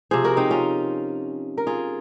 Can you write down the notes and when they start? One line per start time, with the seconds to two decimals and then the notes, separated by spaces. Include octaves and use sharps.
0.11 C3 F3 G#4 C5
0.24 F#4 A#4
0.37 C4 D#4
0.51 C#4 F4
1.58 A#4
1.67 F4 G#4